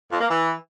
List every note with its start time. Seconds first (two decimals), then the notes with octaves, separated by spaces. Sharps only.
0.11 F2
0.21 A#3
0.30 E3